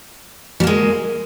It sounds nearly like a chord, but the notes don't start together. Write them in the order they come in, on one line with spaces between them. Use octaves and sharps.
G3 A#3 G#3